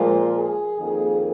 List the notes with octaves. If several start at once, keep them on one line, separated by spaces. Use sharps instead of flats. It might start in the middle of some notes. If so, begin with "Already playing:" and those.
Already playing: A#2 F3 G#3 A#4
G#4
F2 D#3 A#3 G#4